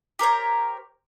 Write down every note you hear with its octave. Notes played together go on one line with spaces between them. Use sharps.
G4 A#4 C5 C#5